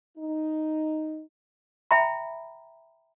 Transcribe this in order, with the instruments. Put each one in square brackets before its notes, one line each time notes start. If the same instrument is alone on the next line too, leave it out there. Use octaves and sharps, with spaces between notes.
[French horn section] D#4
[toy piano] E5 G5 A#5 B5